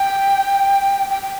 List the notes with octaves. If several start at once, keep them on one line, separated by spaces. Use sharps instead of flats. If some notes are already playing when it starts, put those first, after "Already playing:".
Already playing: G5
G5
G5